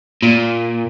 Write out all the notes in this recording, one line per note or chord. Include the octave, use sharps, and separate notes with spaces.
A#2